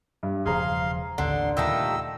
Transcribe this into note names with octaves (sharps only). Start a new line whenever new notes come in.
G2
E1 C#3 F3 G#4 F5 A#5 C6
A1 D#2 D3 C6
A#2 D#3 G3 A3 D#5 E6